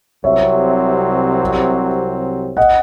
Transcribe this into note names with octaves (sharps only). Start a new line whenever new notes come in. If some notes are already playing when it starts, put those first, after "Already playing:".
C2 C3 F#3 C4 C#5 E5
D#5 F#5